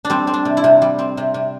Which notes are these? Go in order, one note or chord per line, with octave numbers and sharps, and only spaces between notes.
D4
G3 C4
C4
D4
C3
E4
C3
G3
C4
C3
C3